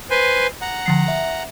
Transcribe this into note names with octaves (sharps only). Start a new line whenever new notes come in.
B4 C5 G#5
F#5 A#5
D3 F3 C7
E5